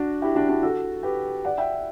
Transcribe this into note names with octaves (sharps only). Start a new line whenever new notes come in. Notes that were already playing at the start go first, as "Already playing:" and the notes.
Already playing: D4 F#4
E4 G4
D4 F#4
D4 F#4
F#4 A4
G4 B4
D5 F#5
E5 G5